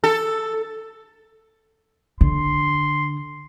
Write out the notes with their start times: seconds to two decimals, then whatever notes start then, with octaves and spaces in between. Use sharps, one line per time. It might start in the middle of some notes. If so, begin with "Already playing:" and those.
0.04 A4
2.21 D3 C6